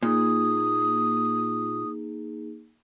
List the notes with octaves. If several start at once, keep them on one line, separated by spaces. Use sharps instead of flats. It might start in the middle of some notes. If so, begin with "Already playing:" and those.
A#2 A#3 D#4 G#4 D#6